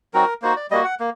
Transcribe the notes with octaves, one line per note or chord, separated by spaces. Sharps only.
F#3 C4 D#4 F#4 A#4
A#3 D#4 F#4 C5
D5
G3 A#3 F#4 D#5
F#5
A#3